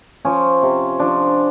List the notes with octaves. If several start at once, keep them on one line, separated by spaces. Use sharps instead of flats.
F3 C#4
C3
F3 D4